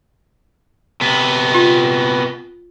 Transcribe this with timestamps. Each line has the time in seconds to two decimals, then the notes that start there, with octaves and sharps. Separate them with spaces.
1.01 C3 B3
1.55 F4